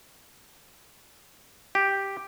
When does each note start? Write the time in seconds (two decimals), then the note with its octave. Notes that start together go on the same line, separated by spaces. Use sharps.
1.75 G4